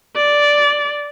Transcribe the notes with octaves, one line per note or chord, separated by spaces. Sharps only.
D5